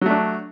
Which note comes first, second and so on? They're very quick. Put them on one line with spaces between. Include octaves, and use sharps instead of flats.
F#3 A3 D4